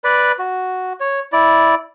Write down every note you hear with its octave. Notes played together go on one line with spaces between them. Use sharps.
B4 D5 B5
F#4
C#5
E4 D5